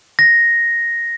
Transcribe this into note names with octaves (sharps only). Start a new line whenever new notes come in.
A#6